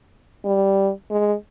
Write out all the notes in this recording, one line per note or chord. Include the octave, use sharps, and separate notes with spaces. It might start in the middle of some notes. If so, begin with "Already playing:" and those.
G3
G#3